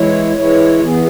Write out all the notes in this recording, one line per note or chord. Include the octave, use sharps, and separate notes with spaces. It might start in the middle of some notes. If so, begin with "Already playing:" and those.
Already playing: E3 G#3 E4 C#5
E3 G#3 E4 C#5
E2 E3 B3 G#4